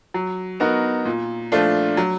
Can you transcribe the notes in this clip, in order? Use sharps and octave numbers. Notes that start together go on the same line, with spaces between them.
F#3
B3 D#4 F#4 A#4
A#2
F3 A3 D4 F4
F#3